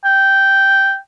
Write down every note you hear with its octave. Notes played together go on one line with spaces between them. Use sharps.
G5